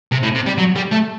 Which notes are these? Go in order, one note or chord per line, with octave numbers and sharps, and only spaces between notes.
C3
A2
C3
G3
F#3
G3
A3